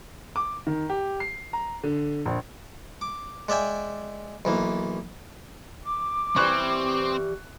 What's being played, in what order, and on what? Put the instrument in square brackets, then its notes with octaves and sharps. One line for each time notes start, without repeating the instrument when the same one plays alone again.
[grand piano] D6
D#3
G4
C7
A#5
D3
A#1
[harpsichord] D6
G#3 D5 E5 G5 G#5
B1 E3 A#3
[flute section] D6
[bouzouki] E3 G3 [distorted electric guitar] C4 C5 [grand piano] C#6 F#6